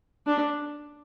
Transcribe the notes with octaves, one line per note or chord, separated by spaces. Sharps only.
D4